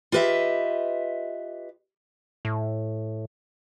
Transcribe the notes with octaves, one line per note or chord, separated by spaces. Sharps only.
F4 G4 B4 D#5 E5
A2